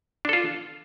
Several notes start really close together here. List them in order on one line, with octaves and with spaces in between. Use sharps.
D4 A4 F4